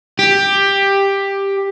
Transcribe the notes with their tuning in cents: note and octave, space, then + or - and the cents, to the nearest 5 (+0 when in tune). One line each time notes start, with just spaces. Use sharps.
G4 +10